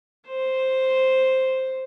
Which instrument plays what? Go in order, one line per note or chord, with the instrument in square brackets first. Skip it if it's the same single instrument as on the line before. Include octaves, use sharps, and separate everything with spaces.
[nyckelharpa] C5